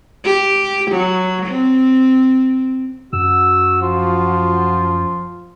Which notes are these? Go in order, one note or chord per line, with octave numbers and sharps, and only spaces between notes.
G4
F#3
C4
F#2 F#4 E6
F3 F4